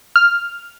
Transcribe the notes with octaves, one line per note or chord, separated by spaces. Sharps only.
F6